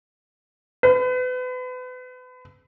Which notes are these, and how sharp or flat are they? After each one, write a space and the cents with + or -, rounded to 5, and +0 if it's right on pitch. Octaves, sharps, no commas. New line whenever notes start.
B4 +35